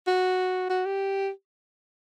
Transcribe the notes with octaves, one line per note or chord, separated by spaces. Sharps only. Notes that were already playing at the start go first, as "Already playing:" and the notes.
F#4
F#4
G4